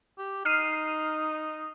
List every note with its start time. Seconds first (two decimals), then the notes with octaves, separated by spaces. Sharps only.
0.18 G4
0.45 D#4 F6 C7 D#7